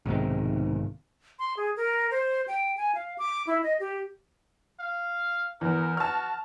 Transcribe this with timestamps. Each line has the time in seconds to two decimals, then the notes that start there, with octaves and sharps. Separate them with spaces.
0.05 B1 G#2 C3 D#3
1.39 C6
1.57 G#4
1.76 A#4
2.11 C5
2.48 G5
2.77 G#5
2.95 F5
3.18 D6
3.47 E4
3.63 D#5
3.80 G4
4.80 F5
5.61 E2 A#4
5.97 F#4 A5 F6